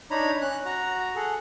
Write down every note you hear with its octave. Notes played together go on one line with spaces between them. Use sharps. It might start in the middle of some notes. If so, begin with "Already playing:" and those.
D4 D#4 C#5 A#5 B5
C#4 F#6
F#4 A#5
G#4 A4 F#5